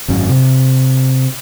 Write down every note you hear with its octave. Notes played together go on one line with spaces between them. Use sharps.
G#1 F#2 C#4
C3